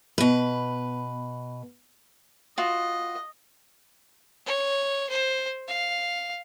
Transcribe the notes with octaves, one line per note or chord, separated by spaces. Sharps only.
B2 B4
F4 F#4 D#5
C#5
C5
F5